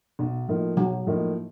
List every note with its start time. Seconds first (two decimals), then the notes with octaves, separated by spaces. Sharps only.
0.19 B1
0.48 A2 F3 A#3 D#4
0.77 B1 F#3
1.07 A2 F3 A#3 D#4